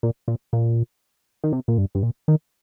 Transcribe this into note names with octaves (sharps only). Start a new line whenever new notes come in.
A#2
A#2
A#2
D#3
C3
A#2
G2
G2
A#2
D#3